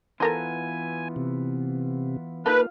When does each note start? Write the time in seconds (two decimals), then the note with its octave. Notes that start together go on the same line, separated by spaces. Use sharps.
0.20 E3 B3 F4 A4 A#4 C5 G#5
1.16 C3
2.46 A#3 D#4 F4 A4 B4 F5